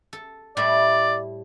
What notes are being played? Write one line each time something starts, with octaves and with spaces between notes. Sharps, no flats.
A4
A2 G3 E4 D5